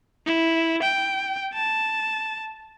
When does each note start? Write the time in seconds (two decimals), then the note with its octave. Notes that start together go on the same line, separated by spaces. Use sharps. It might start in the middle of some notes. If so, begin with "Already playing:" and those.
0.26 E4
0.82 G5
1.54 A5